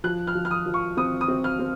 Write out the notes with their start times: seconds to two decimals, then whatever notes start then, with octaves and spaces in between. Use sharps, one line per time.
0.04 F3 F#6
0.27 F6
0.35 F3
0.45 F6
0.51 D#6
0.66 F3
0.74 C#6
0.97 C4 D#6
1.21 D#6
1.28 C4
1.44 F6
1.59 C4